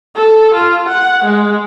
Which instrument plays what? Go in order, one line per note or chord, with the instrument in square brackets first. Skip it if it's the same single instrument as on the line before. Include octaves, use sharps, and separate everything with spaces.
[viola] A4
F4
F#5
G#3